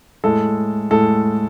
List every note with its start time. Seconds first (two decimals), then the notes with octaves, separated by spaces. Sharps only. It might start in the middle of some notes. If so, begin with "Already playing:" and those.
0.24 A2 G#3 A4
0.91 A2 G#3 A4